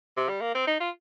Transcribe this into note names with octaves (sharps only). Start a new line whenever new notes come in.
C3
G3
A#3
C4
D#4
F4